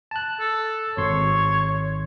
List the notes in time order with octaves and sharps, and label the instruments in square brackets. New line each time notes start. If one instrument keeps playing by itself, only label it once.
[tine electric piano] A5 F#6
[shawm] A4
[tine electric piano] G#1 C6 [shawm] C#5